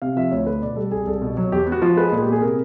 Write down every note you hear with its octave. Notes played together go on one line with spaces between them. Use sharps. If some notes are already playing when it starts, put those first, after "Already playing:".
C3 F5
F3 E5
D2 C#5
A3 B4
B2 D5
G3 A4
C2 G#4
C2 A4
B2
F#3
E2 G4
B3
F#4
F3 F4
G#3 B4
A#2 G#4
B3 G4
G#4
C3 A#4